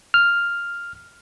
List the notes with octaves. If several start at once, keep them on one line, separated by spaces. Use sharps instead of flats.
F6